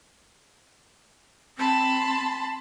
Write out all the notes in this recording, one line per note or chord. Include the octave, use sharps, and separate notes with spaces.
C4 A5 B5 C6